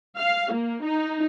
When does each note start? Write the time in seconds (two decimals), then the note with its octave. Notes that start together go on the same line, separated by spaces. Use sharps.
0.17 F5
0.52 A#3
0.82 D#4